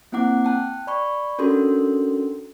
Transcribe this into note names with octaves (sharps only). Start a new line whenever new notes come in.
A#3 C4 E4 F#5 D6 F#6
G5 A5 F#6
D5 B5 C#6
C#4 D4 F#4 A4 A#4 C6